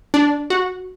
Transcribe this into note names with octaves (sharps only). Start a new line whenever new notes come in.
D4
F#4